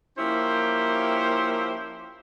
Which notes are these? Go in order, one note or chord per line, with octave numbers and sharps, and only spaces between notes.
F3 A#3 C#4 E4 G4 C5